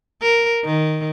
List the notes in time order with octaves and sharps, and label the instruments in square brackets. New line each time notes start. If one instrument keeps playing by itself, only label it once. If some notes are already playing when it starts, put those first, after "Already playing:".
[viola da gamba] A#4
D#3